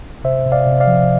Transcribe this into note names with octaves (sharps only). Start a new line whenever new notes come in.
C3 C5 E5
C3
D5 F5
C3
D5 F5
F3